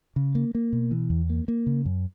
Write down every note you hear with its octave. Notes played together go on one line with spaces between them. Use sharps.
C#3
A#3
A#3
B2
E3
E2
A#3
A#3
C#3
F#2